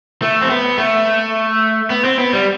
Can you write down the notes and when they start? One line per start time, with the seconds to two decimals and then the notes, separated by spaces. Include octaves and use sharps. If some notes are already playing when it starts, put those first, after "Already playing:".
0.22 A3
0.41 C4
0.50 B3
0.78 A3
1.90 B3
2.04 C4
2.19 B3
2.33 G3